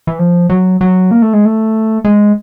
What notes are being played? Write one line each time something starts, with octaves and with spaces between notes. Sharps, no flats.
E3
F3
F#3
F#3
A#3
A3
G#3
A3
G#3